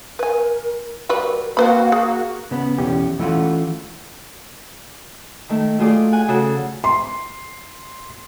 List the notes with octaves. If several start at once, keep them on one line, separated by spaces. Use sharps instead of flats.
A#4 B4 G#5
F#3 G3 A#4 B4
A#3 C4 F#4 B4 F5 B5
G#4
C#3 B3
B1 E2 C#4 G4
E3 A3 C#4 D4 F4 F#4
D#3 A3
F#3 A3 F4 G#4 D5
F#5 G#5
C#3 F#4 A4
C6